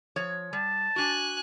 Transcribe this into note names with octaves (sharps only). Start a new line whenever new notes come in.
F3 C#5
G3 A5
D4 F#4 G#5 F#6